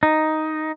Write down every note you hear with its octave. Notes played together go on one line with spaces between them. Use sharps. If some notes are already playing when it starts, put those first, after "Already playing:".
D#4